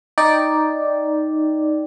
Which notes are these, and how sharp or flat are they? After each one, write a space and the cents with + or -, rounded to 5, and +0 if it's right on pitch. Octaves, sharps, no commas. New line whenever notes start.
D#4 +0 D5 +0 G5 +0